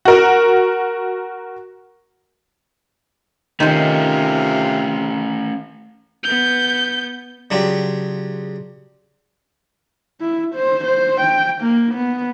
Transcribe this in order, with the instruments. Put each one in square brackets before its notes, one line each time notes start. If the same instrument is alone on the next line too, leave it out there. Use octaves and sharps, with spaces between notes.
[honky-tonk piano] F#4 A#4
[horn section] C3 F4 [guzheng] D#3 C5 [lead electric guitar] A3 C#4
[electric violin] B3 G6
[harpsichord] C#3 F#3 D4 F4 G4
[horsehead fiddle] E4
C5
C5
G5
A#3
B3